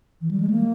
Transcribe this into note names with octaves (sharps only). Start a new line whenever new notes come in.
E3
G3
G#3
A#3